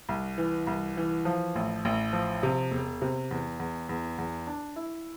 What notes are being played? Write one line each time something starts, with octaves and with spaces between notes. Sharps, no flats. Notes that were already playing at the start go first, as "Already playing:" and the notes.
C2
E3
C2
E3
F3
A1
A1
F3
C3
E1
C3
E2
E2
E2
E2
D4
E4